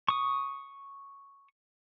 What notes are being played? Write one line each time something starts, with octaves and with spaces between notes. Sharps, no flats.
C#6 D#6